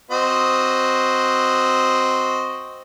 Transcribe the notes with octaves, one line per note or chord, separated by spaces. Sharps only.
C4 F#4 D#5